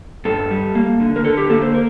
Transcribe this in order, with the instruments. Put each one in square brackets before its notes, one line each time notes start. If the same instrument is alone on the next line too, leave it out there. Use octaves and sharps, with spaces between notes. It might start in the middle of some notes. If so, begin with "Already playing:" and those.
[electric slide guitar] G2 A4
G3
A#3
D3
A#4
D3 A4
G4
A#3 A4
C5
A#4